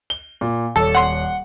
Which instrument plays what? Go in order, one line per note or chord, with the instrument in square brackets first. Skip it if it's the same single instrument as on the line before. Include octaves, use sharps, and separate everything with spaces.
[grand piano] G7
A#2
[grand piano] D#1 C#5 [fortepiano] A4
[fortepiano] F#5 C6